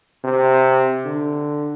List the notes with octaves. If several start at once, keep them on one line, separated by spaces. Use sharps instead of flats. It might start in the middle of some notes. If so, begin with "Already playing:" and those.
C3
D3